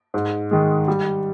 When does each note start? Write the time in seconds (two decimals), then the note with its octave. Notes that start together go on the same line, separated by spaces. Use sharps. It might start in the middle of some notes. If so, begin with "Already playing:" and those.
0.14 G#2
0.51 D#3 G#3
0.88 G3